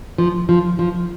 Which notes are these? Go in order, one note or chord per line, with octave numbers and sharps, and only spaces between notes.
F3
F3
F3